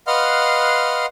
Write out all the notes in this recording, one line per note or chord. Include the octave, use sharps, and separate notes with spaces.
B4 D#5 F5 F#5 C6 F6